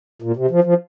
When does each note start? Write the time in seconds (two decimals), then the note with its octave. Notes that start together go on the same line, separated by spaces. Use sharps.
0.22 A#2
0.36 C3
0.51 F3
0.64 F3